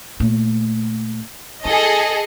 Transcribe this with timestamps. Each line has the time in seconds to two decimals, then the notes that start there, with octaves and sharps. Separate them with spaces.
0.20 A#2 A3
1.65 E4 G#4 A4 D#5